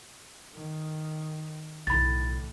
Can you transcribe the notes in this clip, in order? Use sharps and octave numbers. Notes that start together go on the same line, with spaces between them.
D#3
B1 A2 D3 E3 B5 A6